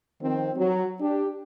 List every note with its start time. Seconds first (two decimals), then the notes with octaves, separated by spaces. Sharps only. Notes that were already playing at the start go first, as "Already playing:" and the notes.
0.22 D#3 F3 C4
0.57 F#3
1.01 D4 G4